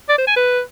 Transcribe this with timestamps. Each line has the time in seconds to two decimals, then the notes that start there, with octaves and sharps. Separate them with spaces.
0.09 D5
0.18 C5
0.27 G#5
0.36 B4